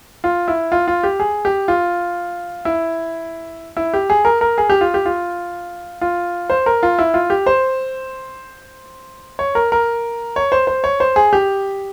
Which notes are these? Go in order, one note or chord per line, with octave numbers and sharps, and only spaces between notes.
F4
E4
F4
F4
G4
G#4
G4
F4
E4
E4
G4
G#4
A#4
A#4
G#4
G4
F4
G4
F4
F4
C5
A#4
F4
E4
F4
G4
C5
C#5
A#4
A#4
C#5
C5
C5
C#5
C5
G#4
G4